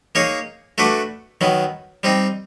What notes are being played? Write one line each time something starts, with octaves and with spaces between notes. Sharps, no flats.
A#3 D#4 G#4 C#5
A3 D4 F#4 B4 D5
D#3 F#3 B3
G3 C4 D#4